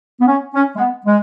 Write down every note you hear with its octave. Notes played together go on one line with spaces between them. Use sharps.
B3
C#4
C#4
G#3
B3
G#3